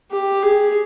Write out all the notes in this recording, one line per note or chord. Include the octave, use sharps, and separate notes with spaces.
G4
G#4